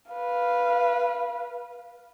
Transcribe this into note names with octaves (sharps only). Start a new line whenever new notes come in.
B4 F5